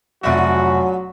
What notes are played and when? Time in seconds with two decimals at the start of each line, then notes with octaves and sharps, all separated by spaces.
0.23 F1 G#2 F#3 F4 F#4 D5 E5